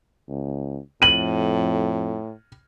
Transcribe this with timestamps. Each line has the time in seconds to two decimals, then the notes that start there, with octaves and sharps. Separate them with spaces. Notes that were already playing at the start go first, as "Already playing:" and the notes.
0.29 C#2
1.02 F2 A2 D#7 F#7